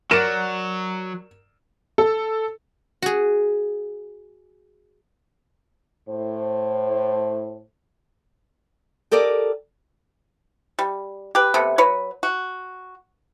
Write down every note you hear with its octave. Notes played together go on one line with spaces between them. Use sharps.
F#3 A#4 D5 F#5 E7
A4
F#4 G#4
A2 C5
G4 A4 A#4 D5 D#5
G3
G4 B4
C3 A3 B3
F#3 B4 C#5
F#4